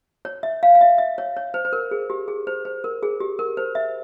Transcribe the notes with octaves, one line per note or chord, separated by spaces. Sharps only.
C#5
E5
F5
F5
E5
E5
C#5
C#5
C5
C5
A#4
G#4
G4
G#4
C5
C5
A#4
G#4
G4
A#4
C5
E5